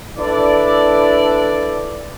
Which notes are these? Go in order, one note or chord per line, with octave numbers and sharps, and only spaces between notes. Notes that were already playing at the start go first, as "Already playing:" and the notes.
D4 E4 A4 B4 D5